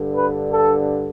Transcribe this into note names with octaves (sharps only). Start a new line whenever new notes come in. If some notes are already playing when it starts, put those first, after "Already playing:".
Already playing: G2 D3
B4
A4